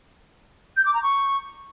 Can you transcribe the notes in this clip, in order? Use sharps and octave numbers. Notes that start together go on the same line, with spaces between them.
G6
D6
A#5
C#6